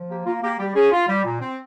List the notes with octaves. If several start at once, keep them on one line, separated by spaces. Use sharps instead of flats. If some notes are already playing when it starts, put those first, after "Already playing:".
Already playing: F3
A#3 G4
A#3 F4
A#3 G4
G3 G4
C#4 G#4
F4
G3
A#2
C4